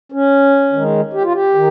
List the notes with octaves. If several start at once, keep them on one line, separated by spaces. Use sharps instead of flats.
C#4
D#3 G#3
G4
F4
G4
D#3